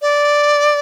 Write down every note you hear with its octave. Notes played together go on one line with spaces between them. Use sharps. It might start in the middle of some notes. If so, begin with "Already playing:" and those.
D5